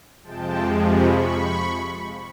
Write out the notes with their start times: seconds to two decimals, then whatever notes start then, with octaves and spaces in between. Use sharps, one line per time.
0.23 F2 C3 F3 G#3 G5 A5
0.82 B5 C#6